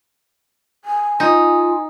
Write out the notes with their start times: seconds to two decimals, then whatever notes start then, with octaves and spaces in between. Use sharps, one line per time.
0.85 G#5
1.20 D#4 F4